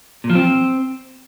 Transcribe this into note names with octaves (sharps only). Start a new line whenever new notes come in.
A#2
F3
C4